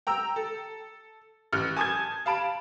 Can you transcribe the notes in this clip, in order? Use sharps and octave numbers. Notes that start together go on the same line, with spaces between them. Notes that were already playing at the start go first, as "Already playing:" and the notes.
G5 A#5 E6
A4
A1 F6 F#6
G#5 A5 D#6 G6 G#6
F5 A5 B5 D7